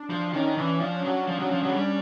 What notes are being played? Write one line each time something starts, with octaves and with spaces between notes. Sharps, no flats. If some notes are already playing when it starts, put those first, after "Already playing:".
Already playing: D4
F3
D#3 C#4
E3
F3
F#3
F3
F#3
F3
F#3
G#3
G3